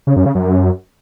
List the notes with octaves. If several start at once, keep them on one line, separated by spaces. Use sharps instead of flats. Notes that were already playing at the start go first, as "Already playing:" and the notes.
C#3
F#2
C#3
F#2